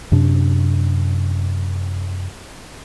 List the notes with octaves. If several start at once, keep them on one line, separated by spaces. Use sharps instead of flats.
F#2 C3 D4